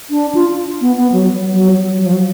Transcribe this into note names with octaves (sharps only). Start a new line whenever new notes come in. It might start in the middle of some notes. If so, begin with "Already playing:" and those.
D4
F4
B3
B3
F#3
F#3
F#3
F#3
F#3
F3
F#3